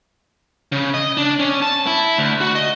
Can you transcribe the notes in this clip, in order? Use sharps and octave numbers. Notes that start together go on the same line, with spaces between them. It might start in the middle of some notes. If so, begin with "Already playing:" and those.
C#3
D#5
D4
C#4
A5
E4
D2
F#4
D#5